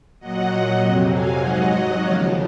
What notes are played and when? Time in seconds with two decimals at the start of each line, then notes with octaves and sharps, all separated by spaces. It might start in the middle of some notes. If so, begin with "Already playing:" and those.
0.19 A#2 F#3 D#5 F#5
0.80 F2 C3 F#3
1.09 F5 G#5
1.39 G#2 F#3 D#5 F#5
1.99 D#2 C#3 F3 C#5 F5